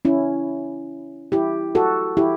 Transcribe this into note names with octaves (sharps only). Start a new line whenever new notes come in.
C#4 E4
E4 G4
F#4 A4
E4 G4